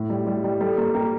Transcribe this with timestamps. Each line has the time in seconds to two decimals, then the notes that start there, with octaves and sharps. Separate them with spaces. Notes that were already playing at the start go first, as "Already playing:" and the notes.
Already playing: A2
0.10 G3
0.27 G3
0.44 G3
0.60 G3 A4
0.77 A#3
0.95 A#3 G4